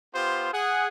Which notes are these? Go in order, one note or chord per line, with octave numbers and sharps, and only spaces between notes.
B3 F4 G4 C5
G#4 F#5